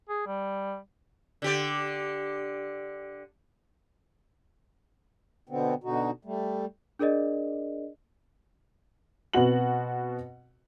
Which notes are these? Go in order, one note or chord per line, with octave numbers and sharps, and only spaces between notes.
G#4
G3
D3 G4 D5
B2 D3 B3 C4
B2 D3 D#4 F#4
G3 A3
D4 G#4 A#4 D5 D#5
B2 B3 C4 F#4 F#7